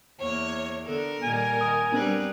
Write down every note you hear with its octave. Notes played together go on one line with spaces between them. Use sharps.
E2 A#3 C#5
D3 B3 A4 A#4
A#2 D#3 G3 G#5
D#3 D#6
G3 B3 C4 D4 G#4 B4